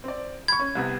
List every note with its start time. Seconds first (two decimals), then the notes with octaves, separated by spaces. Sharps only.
0.04 C4 D5
0.48 B5 C#6 G#6
0.60 C#4
0.75 C2 C3 B3